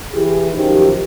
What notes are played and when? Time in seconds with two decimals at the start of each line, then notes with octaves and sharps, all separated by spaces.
0.12 E3 E4 G4 G#4
0.53 F#2 D#3 F3 D#4 G4